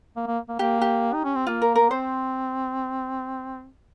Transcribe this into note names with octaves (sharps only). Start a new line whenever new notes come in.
A#3
A#3
A#3
A#3 G4
G4
D#4
C#4
C4
A#3 F4
A#4
A#3 A#4
C4 C5